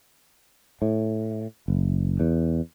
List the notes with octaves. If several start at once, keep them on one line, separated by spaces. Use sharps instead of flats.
A2
F#1
E2